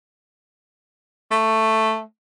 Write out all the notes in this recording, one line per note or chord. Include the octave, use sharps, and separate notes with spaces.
A3